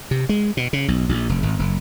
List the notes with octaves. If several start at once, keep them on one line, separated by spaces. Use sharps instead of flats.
C3
G#3
B2
C#3
B1
A#1
F1
G#1
F#1